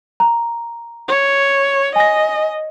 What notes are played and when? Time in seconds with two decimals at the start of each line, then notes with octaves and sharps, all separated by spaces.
0.20 A#5
1.08 C#5
1.96 D#5 G#5 A#6